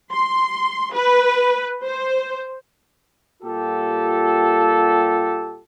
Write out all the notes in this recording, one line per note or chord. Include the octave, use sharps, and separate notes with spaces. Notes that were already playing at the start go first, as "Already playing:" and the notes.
C6
B4
C5
A#2 G3 F4 G4 A4